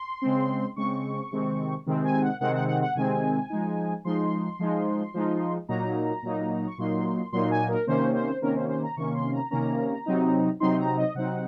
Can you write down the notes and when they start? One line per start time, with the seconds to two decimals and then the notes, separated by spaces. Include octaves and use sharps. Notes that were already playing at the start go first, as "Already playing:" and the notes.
Already playing: C6
0.22 C#3 G#3 C4
0.76 C#3 G#3 C4 C#6
1.31 C3 D#3 G#3 C4
1.86 C3 D#3 G#3 C4
2.05 G#5
2.22 F#5
2.41 C3 D#3 G#3 C4 F#5
2.55 F#5
2.68 F#5
2.82 F#5
2.95 C3 D#3 G#3 C4 G#5
3.50 F3 G#3 D#4
4.05 F3 G#3 D#4 C6
4.59 F3 G#3 D#4
5.14 F3 G#3 D#4
5.69 A#2 F#3 A#3 D#4 A#5
6.23 A#2 F#3 A#3 D#4
6.67 C#6
6.78 A#2 F#3 A#3 D#4 C6
7.32 A#2 F#3 A#3 D#4 C6
7.51 G#5
7.69 A#4
7.87 C3 D#3 A#3 C#4 C5
8.15 C5
8.42 C3 D#3 A#3 C#4 A#4
8.55 C5
8.69 C5
8.83 A#5
8.97 C3 D#3 A#3 C#4 C#6
9.14 C6
9.33 A#5
9.51 C3 D#3 A#3 C#4 A#5
10.06 C3 F#3 C4 D#4
10.60 C3 F#3 C4 D#4 C6
10.79 A#5
10.97 D#5
11.15 C3 F#3 C4 D#4 F#5